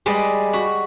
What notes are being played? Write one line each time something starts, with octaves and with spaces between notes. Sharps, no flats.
G3 G#3 B4 D5 D#5
F#4 B5